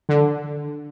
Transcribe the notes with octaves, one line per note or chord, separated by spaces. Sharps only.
D3